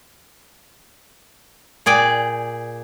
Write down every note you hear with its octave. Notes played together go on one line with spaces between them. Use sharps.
A#2 G#4 D5 G5